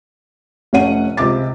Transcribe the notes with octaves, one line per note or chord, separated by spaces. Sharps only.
F1 A3 C#4 F#5 D#7
C#2 C3 D6 A6